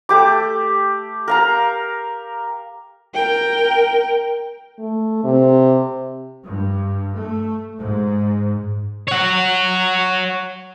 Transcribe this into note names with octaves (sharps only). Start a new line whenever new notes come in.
A3 G4 D6
A#4 F5 A#5
A#4 G5
A3
C3
G2
A3
G#2
C#5 F#5